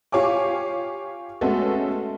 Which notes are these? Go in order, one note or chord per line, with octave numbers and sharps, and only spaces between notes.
F4 G4 C#5 F5 G#5 D6
G#3 A3 B3 C#4 F#4 A4